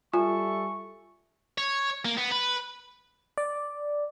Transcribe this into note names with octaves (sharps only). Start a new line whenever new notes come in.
G3 F4 A4 E5 G#5 C#6
C#5
A#3
B3
B4
D5